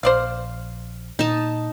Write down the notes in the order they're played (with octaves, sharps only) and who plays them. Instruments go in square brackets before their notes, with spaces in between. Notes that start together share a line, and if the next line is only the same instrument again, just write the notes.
[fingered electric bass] A#1 [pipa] C5 D5 F5
[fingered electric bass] A#2 [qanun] D#4 A5